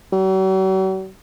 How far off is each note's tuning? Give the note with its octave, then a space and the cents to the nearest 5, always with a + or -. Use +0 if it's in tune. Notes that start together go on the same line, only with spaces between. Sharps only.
F#3 +45